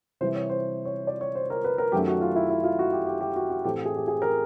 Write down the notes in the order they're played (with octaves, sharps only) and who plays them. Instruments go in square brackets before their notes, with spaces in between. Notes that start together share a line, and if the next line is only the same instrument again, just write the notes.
[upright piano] C3 E3 G3 C5
C#5
C5
C#5
D5
C#5
C5
A#4
B4
A#4
F#2 D#3 F#3 A3 C#4 G4
F#4
F4
E4
E4
F4
F#4
G4
G4
G4
F#4
F#4
A2 E3 A3 C4 G4
G#4
G4
G#4
A#4